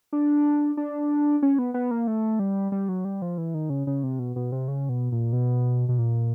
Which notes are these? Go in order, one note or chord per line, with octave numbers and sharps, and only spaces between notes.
D4
D4
C#4
B3
B3
A#3
A3
G3
G3
F#3
G3
F3
E3
D#3
C#3
C#3
C3
B2
B2
C3
C#3
B2
A#2
B2
B2
A#2